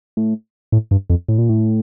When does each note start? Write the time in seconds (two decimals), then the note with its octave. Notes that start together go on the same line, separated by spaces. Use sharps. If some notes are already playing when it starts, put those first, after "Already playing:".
0.17 A2
0.72 A2
0.91 G2
1.10 F2
1.29 A2
1.38 A#2
1.49 A2